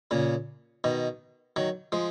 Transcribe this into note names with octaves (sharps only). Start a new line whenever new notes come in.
A#2 C#3
B2 D#3
D#3 F#3
F3 G#3